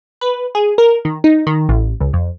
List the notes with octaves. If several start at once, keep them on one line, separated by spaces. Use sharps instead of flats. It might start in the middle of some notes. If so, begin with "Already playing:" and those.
B4
G#4
A#4
D#3
D#4
D#3
A1
C#2
F2